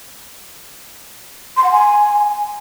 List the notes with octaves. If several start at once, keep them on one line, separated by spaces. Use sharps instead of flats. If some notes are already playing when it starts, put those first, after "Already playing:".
C6
F#5
G#5